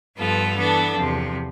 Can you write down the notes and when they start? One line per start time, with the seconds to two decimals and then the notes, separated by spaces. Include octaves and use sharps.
0.17 G2 F3 B3 F4 A4
0.56 E3 B3 D4 A4
0.94 E2 C3 F3